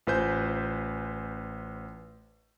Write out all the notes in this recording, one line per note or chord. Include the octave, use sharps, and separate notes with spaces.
A1 F4 B4 C5 G#5 G6